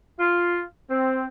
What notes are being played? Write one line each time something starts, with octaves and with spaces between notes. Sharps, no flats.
F4
C4